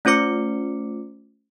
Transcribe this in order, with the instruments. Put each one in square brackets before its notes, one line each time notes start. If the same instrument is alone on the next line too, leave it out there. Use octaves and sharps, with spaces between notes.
[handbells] A3 C#4 F4 C5 D6 C#7